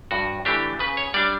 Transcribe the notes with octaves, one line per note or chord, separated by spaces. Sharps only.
G2 F#4
E3 A3 D4 G4
C#3 B4
C#5
G3 D4 D5